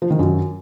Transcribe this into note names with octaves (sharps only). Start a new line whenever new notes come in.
F3
D#3
F#2